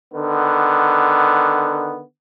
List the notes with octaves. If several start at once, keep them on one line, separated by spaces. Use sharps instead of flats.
D3 D#3 B3